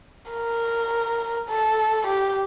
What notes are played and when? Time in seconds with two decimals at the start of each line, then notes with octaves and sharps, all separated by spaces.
0.31 A#4
1.49 A4
2.07 G4